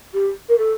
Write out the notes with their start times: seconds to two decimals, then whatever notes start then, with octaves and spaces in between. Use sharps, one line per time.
0.14 G4
0.49 A#4
0.58 A4